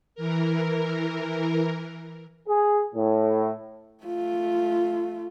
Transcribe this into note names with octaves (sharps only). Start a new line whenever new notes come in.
E3 A#4
G#4
A2
A3 F4